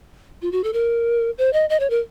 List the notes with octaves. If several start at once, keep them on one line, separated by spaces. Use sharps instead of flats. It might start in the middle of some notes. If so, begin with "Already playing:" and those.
F4
F#4
A4
A#4
C5
D#5
D#5
C#5
A#4